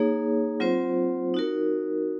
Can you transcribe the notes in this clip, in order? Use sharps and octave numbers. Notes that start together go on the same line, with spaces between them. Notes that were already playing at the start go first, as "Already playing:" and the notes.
Already playing: A#3 D#4 G#4 C#5
F#3 C4 F4 C5
D#4 F#4 A#4